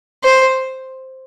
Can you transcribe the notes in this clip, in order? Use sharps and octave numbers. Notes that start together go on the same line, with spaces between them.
C5